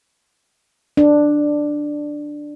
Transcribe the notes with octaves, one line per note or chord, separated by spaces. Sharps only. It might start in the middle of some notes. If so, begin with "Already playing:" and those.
D4